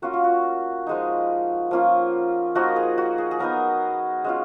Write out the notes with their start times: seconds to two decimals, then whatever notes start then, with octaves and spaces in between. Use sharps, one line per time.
0.02 A#3 C#4 F4 F#4
0.13 F4
0.24 F#4
0.86 F3 G#3 D#4
1.71 F3 A#3 C#4 F4
2.55 F3 A#3 D#4 F#4
2.76 G#4
2.98 F#4
3.18 G#4
3.31 G#4
3.39 F#3 B3 D#4 A#4
4.24 G#3 C#4 F4